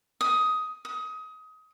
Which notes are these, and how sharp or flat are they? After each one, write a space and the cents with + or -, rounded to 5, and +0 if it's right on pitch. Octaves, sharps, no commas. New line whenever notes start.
D#6 +10
D#6 +25